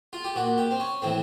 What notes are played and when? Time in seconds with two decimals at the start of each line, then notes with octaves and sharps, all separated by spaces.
0.13 F4
0.24 G4
0.35 A#2 F#4
0.58 G4
0.71 C4
0.80 C#4
1.02 A2 E3 C4